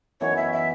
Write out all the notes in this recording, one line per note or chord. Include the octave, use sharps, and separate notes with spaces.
F#2 E3 B3 D#4 C#5
E5
E5